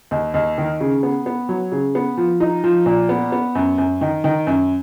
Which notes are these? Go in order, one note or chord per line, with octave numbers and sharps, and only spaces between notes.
D#2
D#2
D#3
C#3
B3
B3
F#3
C#3
B3
F3
D#4
F3
A#2
B3
B3
F#2
F#2
D#3
D#3
F#2